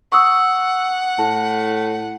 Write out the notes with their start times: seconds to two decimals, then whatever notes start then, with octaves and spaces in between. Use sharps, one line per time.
0.12 F#5 C#6 D#6 E6
1.19 A2 A5